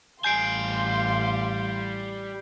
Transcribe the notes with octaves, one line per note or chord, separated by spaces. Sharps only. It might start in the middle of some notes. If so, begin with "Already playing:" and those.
A1 G3 F5 G#5 C6 G6 C7 D7